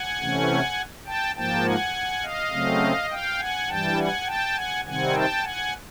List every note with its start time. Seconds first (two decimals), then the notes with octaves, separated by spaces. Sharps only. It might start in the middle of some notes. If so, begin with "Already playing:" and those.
Already playing: F#5 G#5
0.20 C3 E3 A3 C#4
1.06 G5 A5
1.35 G#2 F3 A#3 G5 A5
1.64 F#5 G#5
2.23 D#5 F5
2.52 C#3 F#3 A3 C4
3.10 F5 G5
3.39 F#5 G#5
3.68 G2 E3 G3 G5 A5
3.97 F#5 G#5
4.26 G5 A5
4.55 F#5 G#5
4.84 C3 D#3 G3 C4 F#5 G#5
5.13 G5 A5
5.43 F#5 G#5